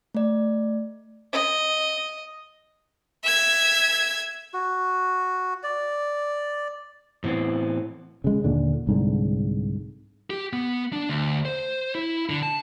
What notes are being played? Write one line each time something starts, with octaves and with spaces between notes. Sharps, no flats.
A3 D5
D#5
E5 G#6
F#4
D5
A2 E3 B3 C4
C#3 G#3
D#2 A#2 D3
C2 G#2 D3
G4
B3
D4
D2
C5
E4
D3
A5